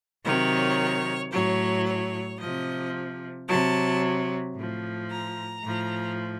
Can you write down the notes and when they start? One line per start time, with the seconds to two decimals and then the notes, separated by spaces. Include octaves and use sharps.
0.23 C3 D#3 F#3 C#5
1.31 A2 F#3 C#5
1.86 C#5
2.39 C3 F3 D#5
3.48 C3 F#3 A5
4.55 A2 F3
5.09 A#5
5.63 A2 F3